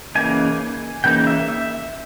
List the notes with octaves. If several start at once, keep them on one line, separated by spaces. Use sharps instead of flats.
C#3 E3 A#3 D#4 G#5
C#3 E3 A#3 D#4 G5
E5
E5